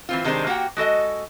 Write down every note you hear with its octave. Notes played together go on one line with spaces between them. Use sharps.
E3 C4 F4
C3 D#3 G3 G#3 D4 C5
A#3 F#4 G4 F#5 G5
G#3 F#4 A4 D#5